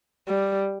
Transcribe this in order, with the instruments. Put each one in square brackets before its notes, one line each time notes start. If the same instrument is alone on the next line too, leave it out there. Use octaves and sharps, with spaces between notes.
[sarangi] G3